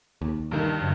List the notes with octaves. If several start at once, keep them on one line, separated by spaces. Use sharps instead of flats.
D#2
G2 D#3
F#2 C#3 G#6